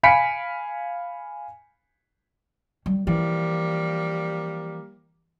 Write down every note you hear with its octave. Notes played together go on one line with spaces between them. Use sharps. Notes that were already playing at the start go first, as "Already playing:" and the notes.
F5 G#5 B5 B6 C#7 D7
G3
E3 F3 G3 A#3